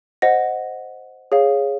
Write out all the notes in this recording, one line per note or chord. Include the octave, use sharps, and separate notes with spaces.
C5 D#5 F#5 A#6
G#4 C#5 F5